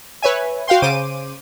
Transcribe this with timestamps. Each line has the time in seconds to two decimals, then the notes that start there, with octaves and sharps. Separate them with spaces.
0.22 B4 C#5 E5 G#5
0.68 F#4 F5 G5 C6
0.82 C#3 C5 D6 D#7